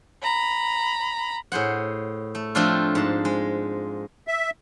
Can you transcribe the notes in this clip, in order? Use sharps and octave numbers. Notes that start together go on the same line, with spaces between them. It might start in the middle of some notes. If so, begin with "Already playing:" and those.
A#5 B5
A2 G#4 C5 F#5
A3
F3 A3 C4 D4 F4
G#2 A5
G#3
E5